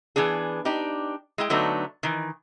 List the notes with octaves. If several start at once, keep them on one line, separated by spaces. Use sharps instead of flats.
E3 B3 D4 G#4
D4 D#4 G4
G#3 E4 G5
D3 F#3 A3 B3 D4 D#4
D#3 E3